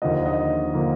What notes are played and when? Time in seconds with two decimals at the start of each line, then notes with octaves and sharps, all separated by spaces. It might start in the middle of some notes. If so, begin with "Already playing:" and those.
0.02 D#2 D3 F3 A#3 D#5
0.26 D#5
0.73 D3 F3 A#3